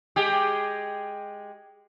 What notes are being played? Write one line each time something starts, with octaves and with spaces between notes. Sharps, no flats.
G#3 G4 G#4